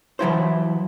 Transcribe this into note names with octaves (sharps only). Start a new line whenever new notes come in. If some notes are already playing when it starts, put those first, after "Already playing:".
E3 F#3 E4 C5